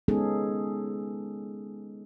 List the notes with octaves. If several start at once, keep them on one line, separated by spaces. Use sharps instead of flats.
G#3 B3 C#4 D#4 G#4 A4